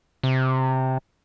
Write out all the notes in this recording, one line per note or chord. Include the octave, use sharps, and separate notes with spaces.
C3